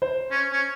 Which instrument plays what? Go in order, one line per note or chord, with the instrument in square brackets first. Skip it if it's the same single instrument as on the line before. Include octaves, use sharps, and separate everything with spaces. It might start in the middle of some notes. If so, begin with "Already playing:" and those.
[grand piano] C5
[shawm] C#4
C#4